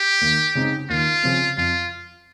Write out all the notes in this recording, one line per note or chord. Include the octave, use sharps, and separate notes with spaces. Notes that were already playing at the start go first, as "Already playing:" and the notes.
Already playing: G4
D#2
C#3 G#3 C4 D#4
D#2 F4
C#3 F3 C4
F2 F4